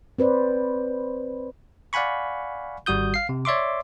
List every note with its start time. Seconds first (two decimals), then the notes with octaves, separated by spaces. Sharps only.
0.19 C4 B4 C5 D5
1.93 D5 F5 F#5 G#5 B5 C#6
2.86 G#1 G3 F#4 D#6 G6
3.14 F5 C7
3.29 C3
3.45 C#5 D5 E5 C6 D6